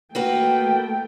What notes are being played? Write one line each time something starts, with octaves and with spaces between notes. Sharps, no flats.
A3 A#3 F#4 B4 G5